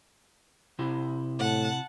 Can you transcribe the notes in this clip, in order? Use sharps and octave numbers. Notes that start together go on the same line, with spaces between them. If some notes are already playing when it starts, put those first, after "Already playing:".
C3 E4 C5
A2 F#5 A5